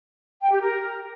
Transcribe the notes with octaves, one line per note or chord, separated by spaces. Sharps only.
G5
G4
A#4